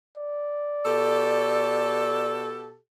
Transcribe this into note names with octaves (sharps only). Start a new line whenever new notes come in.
D5
B2 G4 A4